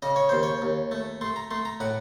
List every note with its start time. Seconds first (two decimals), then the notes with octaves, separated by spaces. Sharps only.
0.02 C#3 D#5
0.16 C#5
0.29 D#2 C5
0.43 C#5
0.62 D#2
0.92 A3
1.21 A3 C6
1.36 A#5
1.51 A3 C6
1.65 A#5
1.80 A2 F#5